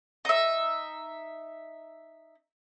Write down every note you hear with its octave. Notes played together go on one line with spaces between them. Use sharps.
D#4 E5